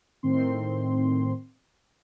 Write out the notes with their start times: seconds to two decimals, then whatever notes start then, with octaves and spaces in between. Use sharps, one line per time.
0.23 A2 D#3 C4 C6